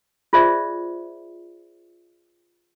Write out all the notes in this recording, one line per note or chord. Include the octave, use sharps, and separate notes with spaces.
F4 G#4 C5 D5 E5